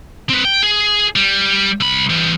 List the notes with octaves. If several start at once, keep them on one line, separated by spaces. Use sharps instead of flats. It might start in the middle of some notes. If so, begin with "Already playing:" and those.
C4 B4
G5
G#4
G3
C2 B5
E3 G3